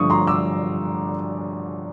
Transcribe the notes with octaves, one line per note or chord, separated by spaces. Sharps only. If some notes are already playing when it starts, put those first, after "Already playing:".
Already playing: G2 D3 F3 A3 C#6 D#6
A#5 C6
D6 E6